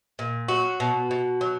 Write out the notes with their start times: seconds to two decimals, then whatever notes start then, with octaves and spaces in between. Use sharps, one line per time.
0.19 A#2
0.48 F#3 F#4
0.80 B2
1.11 B2
1.41 F#3